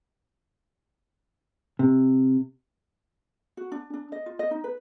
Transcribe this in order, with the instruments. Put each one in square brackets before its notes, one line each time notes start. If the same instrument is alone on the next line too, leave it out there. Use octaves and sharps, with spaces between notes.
[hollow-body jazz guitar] C3
[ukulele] F#4
D4
D4
D#5
F4
D#5
D#4
B4